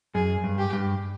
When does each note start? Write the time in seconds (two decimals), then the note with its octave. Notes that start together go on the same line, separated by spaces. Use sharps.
0.15 F#2 G#4
0.44 G2
0.58 G4
0.73 G2